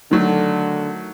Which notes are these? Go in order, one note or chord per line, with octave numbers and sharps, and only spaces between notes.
D3 D#3 F#3 A3